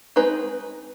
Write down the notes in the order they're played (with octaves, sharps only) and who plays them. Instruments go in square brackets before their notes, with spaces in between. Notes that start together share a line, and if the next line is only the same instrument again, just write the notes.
[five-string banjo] G#3 C4 D#4 B4